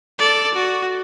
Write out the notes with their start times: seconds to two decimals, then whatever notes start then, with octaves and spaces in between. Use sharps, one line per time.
0.19 A4 D5
0.54 F#4